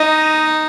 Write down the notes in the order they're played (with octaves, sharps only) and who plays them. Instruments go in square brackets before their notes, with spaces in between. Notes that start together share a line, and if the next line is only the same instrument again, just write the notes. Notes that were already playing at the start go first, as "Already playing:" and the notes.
Already playing: [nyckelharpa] D#4 [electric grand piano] D#5